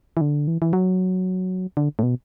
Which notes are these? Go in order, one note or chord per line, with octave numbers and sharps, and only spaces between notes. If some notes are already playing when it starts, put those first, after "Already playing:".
E3
D3
E3
E3
F#3
D3
A2
B2